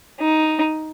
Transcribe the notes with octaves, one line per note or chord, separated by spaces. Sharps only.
D#4